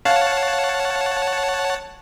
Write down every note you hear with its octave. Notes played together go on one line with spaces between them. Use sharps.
C#5 F5 F#5 A5